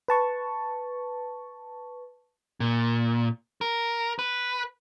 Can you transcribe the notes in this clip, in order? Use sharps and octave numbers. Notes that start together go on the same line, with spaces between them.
B4 A5 C#6
A#2
A#4
B4